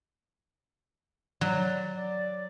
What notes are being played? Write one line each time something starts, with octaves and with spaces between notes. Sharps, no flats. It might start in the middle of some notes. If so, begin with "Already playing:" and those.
F#3 D5
D5